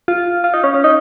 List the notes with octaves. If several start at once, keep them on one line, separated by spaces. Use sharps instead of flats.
F4
F4
D#4
C#4
C#4
D#4